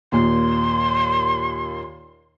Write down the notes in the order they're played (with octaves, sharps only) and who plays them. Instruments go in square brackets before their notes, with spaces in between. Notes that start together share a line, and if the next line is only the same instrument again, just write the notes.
[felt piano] D#2 A#2 [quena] C6